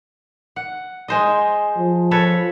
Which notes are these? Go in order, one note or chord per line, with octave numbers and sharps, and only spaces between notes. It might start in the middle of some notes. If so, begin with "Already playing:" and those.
F#5
G#3 C5 D#5
F3
A4 B4 C#5